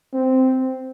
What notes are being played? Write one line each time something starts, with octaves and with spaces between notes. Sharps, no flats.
C4